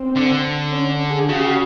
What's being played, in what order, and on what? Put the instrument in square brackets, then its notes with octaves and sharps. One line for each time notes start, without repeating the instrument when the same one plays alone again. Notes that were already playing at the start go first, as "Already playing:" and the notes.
Already playing: [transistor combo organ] C4
[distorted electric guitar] D3
[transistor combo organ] C#4
G#4
[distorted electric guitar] C#3 [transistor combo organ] F#4
[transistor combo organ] G4
F#4